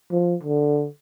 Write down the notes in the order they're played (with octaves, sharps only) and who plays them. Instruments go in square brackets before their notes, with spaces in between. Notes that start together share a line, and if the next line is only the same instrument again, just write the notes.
[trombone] F3
D3